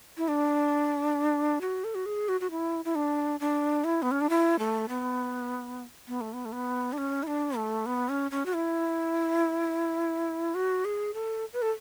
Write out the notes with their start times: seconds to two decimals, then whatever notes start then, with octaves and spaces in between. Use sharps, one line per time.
0.17 E4
0.28 D4
1.61 F#4
1.84 A4
1.95 F#4
2.06 G#4
2.29 F#4
2.41 F#4
2.51 E4
2.85 E4
2.95 D4
3.40 D4
3.84 E4
4.02 B3
4.11 C#4
4.21 D4
4.30 E4
4.59 A3
4.89 B3
6.08 B3
6.21 A3
6.33 B3
6.45 A3
6.52 B3
6.93 D4
6.98 C#4
7.23 E4
7.27 D4
7.57 A3
7.86 B3
8.09 C#4
8.31 C#4
8.46 F#4
8.53 E4
10.55 F#4
10.85 G#4
11.14 A4
11.53 B4
11.62 A4